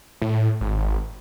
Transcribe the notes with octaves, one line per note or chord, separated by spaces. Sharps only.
A2
G#1